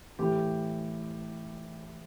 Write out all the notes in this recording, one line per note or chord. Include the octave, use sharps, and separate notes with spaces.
A2 E3 G4